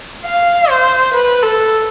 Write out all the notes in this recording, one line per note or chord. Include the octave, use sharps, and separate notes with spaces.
F5
C5
B4
A4